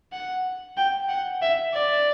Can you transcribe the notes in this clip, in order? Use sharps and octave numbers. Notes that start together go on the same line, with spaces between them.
F#5
G5
F#5
E5
D5